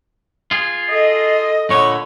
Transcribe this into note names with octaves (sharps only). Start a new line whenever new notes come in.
F4 G#4
A4 D#5
A#2 D3 C#5 B5